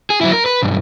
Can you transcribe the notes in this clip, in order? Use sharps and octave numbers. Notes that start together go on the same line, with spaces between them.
G#4
F#3 E4
A#4
B4
B1 G2